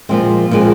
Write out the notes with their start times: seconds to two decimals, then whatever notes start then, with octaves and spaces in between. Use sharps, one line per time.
0.09 A#2 F3 G#3 C4
0.51 A#2 F3 G#3 C4